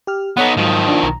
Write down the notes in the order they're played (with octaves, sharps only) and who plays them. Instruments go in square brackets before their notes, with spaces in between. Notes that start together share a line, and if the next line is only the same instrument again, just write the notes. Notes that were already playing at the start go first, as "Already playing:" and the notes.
[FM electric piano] G4 F6
[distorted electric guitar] B3 D#4 [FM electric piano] A4 C#5 F#5
[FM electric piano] G#2 F#3 [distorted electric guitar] D#3 F3
[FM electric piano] D4 F4
B1 A#5